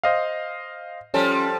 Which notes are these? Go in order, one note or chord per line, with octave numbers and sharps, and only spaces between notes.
C5 D#5 F5
F3 G3 C#4 A4